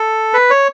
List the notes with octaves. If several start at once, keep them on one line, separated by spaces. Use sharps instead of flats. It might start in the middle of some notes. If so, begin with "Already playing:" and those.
Already playing: A4
B4
C#5